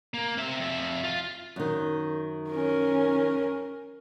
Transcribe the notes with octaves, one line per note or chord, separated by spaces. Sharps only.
A#3
C4 E5
F2 E5
F4
F#2 D#3
C#4 A#4